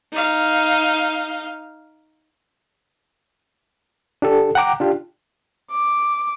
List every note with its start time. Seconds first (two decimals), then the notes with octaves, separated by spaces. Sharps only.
0.13 D#4 F5
4.22 D4 G4 A4
4.55 F#5 G5 A#5 D6
4.80 D4 F4 G4
5.71 D6